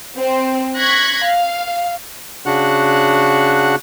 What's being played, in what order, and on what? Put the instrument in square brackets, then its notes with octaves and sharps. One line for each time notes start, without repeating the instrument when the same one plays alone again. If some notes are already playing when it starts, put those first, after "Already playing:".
[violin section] C4
C#6 F#6 G#6 A#6 B6
F5
[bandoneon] C#3 D4 F#4 F#5 F#6